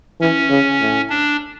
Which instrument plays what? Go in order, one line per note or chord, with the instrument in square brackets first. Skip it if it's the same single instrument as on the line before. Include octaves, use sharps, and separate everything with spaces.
[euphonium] E3 [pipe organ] C#4
[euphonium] C#3
A2
[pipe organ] D4